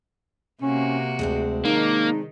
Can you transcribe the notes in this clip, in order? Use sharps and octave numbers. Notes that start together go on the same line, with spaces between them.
C3 A#3 C#4 F#4
D2 G#3 C4 D4
D#3 A#3 D#4